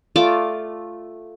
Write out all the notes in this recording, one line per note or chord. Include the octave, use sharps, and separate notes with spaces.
A3 F4 D5 D6